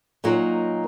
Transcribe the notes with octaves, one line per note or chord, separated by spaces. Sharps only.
A#2 F#3 A#3 D#4